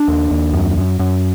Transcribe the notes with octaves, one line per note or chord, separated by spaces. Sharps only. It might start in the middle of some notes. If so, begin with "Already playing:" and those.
Already playing: D4
D#2
D#2
F#2
F#2
F#2